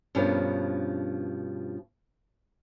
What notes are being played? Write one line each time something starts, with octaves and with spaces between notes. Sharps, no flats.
G2 B2 F3 C#4 D4 A#4